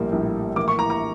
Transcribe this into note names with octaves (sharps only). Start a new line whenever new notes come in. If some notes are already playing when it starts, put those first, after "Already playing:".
Already playing: A#1 A2 G3 A#3
A#1 A2 G3 A#3
A#1 A2 E3 A#3 D6
C#6
A#5
A#5